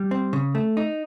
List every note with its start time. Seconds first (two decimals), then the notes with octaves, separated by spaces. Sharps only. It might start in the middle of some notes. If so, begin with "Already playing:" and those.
Already playing: G3
0.11 C4
0.33 C#3
0.55 A3
0.77 D#4